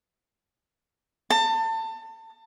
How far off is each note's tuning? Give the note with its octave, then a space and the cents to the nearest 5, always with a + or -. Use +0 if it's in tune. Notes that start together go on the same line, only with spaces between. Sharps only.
A5 +30